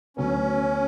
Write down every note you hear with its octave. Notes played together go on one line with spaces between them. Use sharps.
D2 D3 F#3 B3 C#4